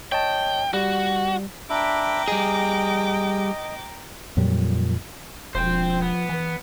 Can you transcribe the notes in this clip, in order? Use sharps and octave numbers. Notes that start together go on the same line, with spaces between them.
C#5 D#5 G5 A5
G3 F#4
D4 E5 G5 A#5 B5 D6
G3 G#4 D#5
F2 A#2 F#3 G3
E1 F3 C5 G5
B3
E3